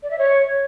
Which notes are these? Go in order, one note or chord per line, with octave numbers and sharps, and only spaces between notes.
D5
E5
C#5